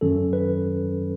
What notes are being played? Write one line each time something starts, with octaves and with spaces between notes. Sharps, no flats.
F#2 D#3 F#3 C#4 A4
B4